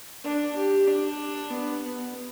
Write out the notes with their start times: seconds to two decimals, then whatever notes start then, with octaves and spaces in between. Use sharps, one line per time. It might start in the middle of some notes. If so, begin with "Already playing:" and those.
0.24 D4
0.56 G4
0.87 D4
1.50 B3
1.82 B3